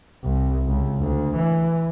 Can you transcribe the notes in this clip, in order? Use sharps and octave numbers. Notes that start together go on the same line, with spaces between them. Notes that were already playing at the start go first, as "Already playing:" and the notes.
C2
C#2
D2
E3